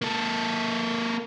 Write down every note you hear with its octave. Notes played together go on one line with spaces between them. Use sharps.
A#3 A4